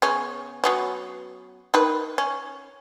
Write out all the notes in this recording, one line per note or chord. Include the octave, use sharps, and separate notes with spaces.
C#3 B3 C#4
F#3 B3 C#4
D#3 B4
C#4